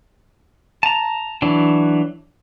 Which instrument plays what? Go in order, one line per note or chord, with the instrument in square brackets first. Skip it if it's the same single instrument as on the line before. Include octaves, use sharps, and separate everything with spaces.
[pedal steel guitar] A5 A#5
E3 F#3 D4